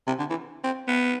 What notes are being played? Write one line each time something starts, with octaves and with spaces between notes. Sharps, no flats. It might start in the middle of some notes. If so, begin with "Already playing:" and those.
C3
D3
E3
C4
B3